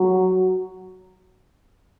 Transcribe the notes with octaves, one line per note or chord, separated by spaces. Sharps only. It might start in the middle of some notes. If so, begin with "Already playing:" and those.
Already playing: F#3